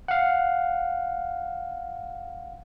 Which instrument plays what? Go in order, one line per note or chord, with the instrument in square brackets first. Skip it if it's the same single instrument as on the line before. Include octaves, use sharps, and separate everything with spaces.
[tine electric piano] F5 F#5